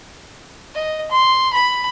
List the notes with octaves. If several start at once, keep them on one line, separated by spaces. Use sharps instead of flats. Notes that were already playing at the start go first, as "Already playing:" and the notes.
D#5
C6
B5